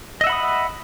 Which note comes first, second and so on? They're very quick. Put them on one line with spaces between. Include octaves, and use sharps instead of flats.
D#5 E5 F#5 B5 D#6